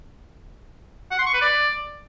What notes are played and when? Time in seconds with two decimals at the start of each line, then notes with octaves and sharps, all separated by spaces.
1.11 F#5
1.19 C6
1.26 C#6
1.34 B4
1.42 D5